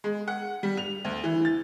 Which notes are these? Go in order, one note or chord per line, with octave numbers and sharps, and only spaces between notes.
G#3
F#5
G3
F7
D2
E3
A6